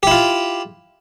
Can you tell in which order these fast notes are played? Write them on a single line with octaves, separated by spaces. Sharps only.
G4 E4 F4